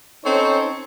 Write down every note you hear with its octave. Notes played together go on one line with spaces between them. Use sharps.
C4 C#4 D#4 A4 C5 C#5